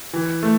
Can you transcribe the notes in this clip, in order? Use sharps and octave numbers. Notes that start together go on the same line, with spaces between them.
E3
A3